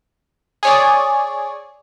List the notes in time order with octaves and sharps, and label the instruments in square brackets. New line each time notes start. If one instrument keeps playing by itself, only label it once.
[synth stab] G#4 C#5 D5